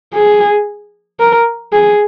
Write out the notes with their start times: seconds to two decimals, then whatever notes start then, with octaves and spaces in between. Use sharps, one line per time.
0.14 G#4
1.20 A#4
1.73 G#4